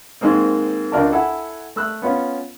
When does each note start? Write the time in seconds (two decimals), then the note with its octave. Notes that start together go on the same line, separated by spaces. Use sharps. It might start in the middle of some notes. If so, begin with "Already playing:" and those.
0.21 G#2 D#3 G#3 A#3 C4
0.92 C#2 D4 F4 A#4 D5 A5
1.12 E4 A4 F#5 G#5
1.76 A3 E6 F#6
2.02 B3 C#4 F4